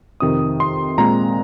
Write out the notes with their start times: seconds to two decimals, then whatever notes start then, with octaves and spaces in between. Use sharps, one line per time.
0.20 F2 C3 D#3 D#6
0.60 C6
0.98 A#2 G#3 C4 A#5